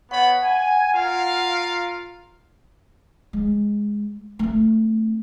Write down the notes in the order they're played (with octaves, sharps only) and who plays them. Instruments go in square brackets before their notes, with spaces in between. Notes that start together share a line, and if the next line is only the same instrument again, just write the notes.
[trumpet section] B3 C#5 B5 [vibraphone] F#5
[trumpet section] G#5
F4 A#4 F5
[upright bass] G#3
A3 C4